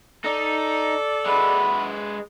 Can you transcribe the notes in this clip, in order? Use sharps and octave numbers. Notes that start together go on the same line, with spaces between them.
D#4 A4 D5
G#3 F#4 B4 E5 B5